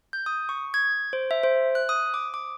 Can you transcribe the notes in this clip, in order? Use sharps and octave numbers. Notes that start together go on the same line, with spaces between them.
G6
D#6
C#6
G#6
C5
E5
C5
F#6
D#6
D6
D6